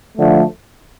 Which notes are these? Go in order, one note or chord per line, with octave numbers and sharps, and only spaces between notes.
D3 F3 A3